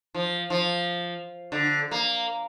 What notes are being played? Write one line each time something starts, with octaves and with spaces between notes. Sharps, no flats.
F3
F3
D3
A#3